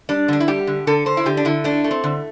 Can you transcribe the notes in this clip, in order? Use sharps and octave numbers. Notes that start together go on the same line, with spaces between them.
G3 D4
D3 D4
E4
G3 G4
D3
D3 A4
D3 C5
E4
D3 G4
D4
D3 E4
A3 D4
A3
C4
D3